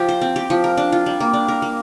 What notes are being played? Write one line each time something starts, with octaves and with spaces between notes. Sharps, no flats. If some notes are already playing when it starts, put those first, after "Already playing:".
Already playing: F3 G4
C5
C4
G4
F3
A#4
D4
F4
G3
A#3
D4
A#4
A#3